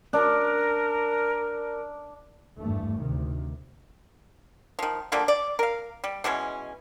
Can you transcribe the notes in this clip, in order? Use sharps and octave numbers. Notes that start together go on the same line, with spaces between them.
D4 A#4
G#1 E2 G2 A3
D2 C3 D#3
D#3 F3
D3 F3 G3 A#3
D5
A#4 F5
G3
B2 E3 G#3 C#4